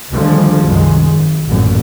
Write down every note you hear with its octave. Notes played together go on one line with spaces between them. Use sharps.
D2 D3 D#3 F3 G3 G#3
C2 F#2 D#3 G#3
G#1
A1 F#2 A#2